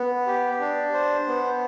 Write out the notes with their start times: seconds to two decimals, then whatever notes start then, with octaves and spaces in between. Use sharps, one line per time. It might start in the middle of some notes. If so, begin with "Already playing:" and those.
Already playing: B3
0.27 G4
0.60 D4
0.93 C5
1.27 B3